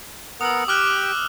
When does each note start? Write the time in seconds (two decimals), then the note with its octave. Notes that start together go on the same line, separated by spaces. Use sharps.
0.41 B3 A#4 F#5 D#6 E6
0.68 G4 G5 D6 F6 F#6